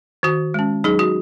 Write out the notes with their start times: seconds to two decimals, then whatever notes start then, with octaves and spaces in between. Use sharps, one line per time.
0.23 D#3 F#4
0.54 G#3 C#4
0.84 F#3 D#4 G#4
0.99 F#4